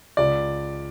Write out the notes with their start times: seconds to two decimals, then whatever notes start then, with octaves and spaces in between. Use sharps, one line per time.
0.17 C#2 D5